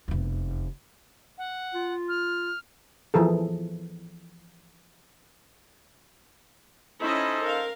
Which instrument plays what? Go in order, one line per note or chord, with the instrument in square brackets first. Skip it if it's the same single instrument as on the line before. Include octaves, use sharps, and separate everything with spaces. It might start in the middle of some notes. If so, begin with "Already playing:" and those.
[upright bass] F1 E2
[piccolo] F#5
[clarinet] F4
[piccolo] F6
[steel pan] E3 F3 G#4 A4
[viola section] C#4 E4 D#5 [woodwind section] D#4 A4 C5
[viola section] A#4 F5